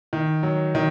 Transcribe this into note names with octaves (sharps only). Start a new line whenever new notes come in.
D#3
F#3
D#3